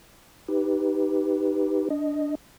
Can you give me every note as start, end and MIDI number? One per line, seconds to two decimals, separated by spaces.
0.48 1.89 63
0.48 1.89 67
0.48 1.89 71
1.90 2.35 62
1.90 2.35 75